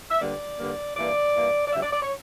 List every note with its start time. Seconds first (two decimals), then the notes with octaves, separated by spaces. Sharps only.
0.11 E5
0.21 G2 D3 G3 A#3 D5
0.59 G2 D3 G3 A#3
0.97 G2 E3 A#3 D5
1.35 G2 E3 A#3
1.67 D5
1.73 F2 D3 G3 E5
1.82 D5
1.93 D5
2.02 C#5